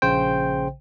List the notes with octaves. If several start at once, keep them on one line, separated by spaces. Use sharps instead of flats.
A#1 C#3 C5 G5